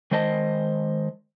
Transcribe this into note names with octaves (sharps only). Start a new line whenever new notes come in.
D#3 G#3 C5 D#5 A5